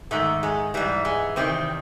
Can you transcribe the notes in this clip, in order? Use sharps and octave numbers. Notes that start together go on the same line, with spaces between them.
G#2 D#3 A3
G#3
G#2 E3 G3
G#3
E2 C3 D#3 C4